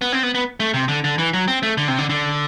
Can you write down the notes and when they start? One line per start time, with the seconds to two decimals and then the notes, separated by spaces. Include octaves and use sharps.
0.01 B3
0.12 C4
0.23 B3
0.35 B3
0.60 A3
0.74 C3
0.88 D3
1.04 D3
1.18 E3
1.34 F#3
1.48 C4
1.63 A3
1.77 D3
1.88 C3
1.98 D3
2.09 D3